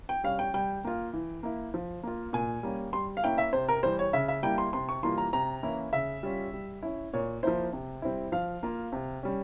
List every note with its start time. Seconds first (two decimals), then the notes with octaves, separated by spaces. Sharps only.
0.09 G5
0.24 G3 C#4 F5
0.39 G5
0.54 G3 G5
0.84 A#3 F4
1.13 E3
1.43 A#3 E4
1.74 F3
2.03 A#3 F4
2.33 A#2 G#5
2.63 G3 A#3 C#4
2.93 G3 C6
3.17 F5
3.24 A#3 C#4 E4 G5
3.38 E5
3.53 C3 C5
3.68 A#4
3.83 E3 G3 C5
3.99 C#5
4.13 C#3 E5
4.28 E5
4.43 G3 A#3 E4 G5
4.58 C6
4.73 C3 C6
4.89 C#6
5.03 E3 G3 A#3 F4 C6
5.18 A#5
5.33 C3 A#5
5.63 E3 A#3 C#4 E4
5.92 C#3 E5
6.23 G3 C#4 F4
6.53 G3
6.83 C#4 E4
7.13 A#2 C#5
7.43 F3 A#3 E4 C5
7.73 C3
8.02 G3 C4 E4
8.32 F3 F5
8.63 A#3 F4
8.92 C3
9.23 G3 C#4